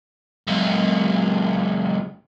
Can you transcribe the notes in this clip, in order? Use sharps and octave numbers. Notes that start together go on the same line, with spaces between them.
C#2 F#2